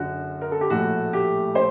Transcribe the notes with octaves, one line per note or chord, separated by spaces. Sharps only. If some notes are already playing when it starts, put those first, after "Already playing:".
Already playing: F#1 F#2 D3 F#4
A#4
A4
G4
A#1 A2 A3 F#4
G4
C5